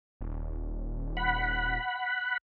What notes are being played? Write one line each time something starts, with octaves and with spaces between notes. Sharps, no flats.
D#1
F#5 B5